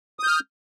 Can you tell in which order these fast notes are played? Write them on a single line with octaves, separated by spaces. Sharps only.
D#6 G6 F6